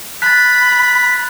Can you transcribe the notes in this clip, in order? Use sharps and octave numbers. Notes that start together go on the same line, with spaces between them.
B5 F#6 A6 B6